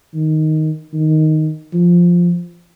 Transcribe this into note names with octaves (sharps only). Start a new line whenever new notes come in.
D#3
D#3
F3